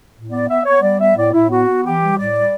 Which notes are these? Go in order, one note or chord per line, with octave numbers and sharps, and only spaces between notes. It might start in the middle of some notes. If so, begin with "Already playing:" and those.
A2
B3 D5
B3 E5
B3 C#5
G3 D5
B3 E5
A2 D5
A2 E4
B3 F#4
B3
E3 G4
G3
A2 D5
G3